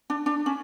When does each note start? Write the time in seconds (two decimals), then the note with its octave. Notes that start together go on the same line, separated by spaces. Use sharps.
0.10 D4
0.26 D4
0.46 C#4